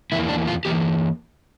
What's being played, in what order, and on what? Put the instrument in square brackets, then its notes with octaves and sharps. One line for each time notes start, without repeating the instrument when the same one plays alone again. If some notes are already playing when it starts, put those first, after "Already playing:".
[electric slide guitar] E2 E3 A#3 E4
D4
F4
E2 E3 A#3 G4